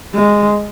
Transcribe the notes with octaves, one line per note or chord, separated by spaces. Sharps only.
G#3